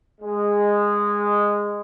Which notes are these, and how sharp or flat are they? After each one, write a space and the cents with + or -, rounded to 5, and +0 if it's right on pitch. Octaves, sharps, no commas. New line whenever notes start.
G#3 -15